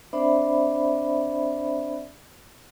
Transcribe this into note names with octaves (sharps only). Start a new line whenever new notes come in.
C4 D4 C5 D5 E5 B5